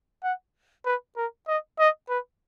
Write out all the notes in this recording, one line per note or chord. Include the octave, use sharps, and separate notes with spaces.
F#5
B4
A#4
D#5
D#5
B4